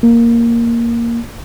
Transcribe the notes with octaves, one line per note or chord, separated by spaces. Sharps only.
A#3